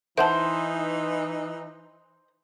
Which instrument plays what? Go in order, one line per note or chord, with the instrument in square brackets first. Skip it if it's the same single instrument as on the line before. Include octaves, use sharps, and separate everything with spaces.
[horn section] E3 D#4 [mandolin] C5 [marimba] E5 F#5 A5